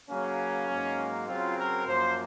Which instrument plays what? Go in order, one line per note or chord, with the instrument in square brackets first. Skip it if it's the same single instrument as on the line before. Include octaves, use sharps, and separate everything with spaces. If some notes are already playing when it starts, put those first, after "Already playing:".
[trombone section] C#3 F#3 A#3 C#4
G#2 F#3 A#3
C#3 F#3 C4 F4
A#4
F#2 F3 A#3 C5